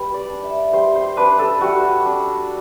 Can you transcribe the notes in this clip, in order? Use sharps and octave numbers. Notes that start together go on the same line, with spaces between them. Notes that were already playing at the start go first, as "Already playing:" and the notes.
Already playing: G3 B4
D5
D4
E5
G3 C5
C5
D4 B4
A4
G3 F#4
D4